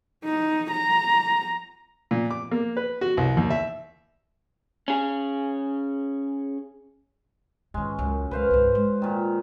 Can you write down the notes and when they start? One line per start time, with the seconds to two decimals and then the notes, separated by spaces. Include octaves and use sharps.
0.24 D#4
0.71 A#5
2.11 A#2
2.31 D6
2.51 A#3
2.77 B4
3.01 F#4
3.17 C2
3.37 D#2
3.50 E5
4.88 C#4 G#4
7.74 G#2 D#3 G#3 C#4
7.99 C#2 F#2
8.31 C#2 B4 C5 F5
8.51 G#1 C#2
8.75 G#3
9.02 A#2 D#3